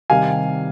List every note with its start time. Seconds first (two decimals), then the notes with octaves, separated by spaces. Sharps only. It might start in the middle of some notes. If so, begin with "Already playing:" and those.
0.10 C3 D#3 G3 F5 G#5